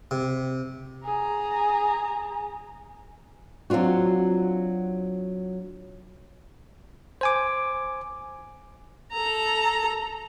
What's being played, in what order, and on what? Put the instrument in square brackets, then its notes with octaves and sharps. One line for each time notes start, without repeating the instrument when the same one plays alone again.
[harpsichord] C3
[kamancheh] G#4 A#5
[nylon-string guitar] F#3 C4 D4 F4 F#4
[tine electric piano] C5 G#5 D6
[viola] A4 A#5